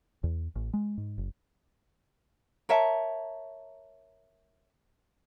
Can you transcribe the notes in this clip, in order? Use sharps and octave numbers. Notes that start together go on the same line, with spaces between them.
E2
A1
G#3
G#2
F#1
A#4 C#5 E5 A5